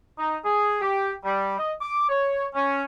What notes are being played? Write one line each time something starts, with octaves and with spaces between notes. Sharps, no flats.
D#4
G#4
G4
G3
D#5
D6
C#5
C#4